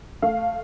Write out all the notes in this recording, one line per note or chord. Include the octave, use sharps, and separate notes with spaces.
A3 F5